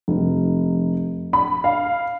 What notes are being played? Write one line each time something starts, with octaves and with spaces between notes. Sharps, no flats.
F1
B5
F5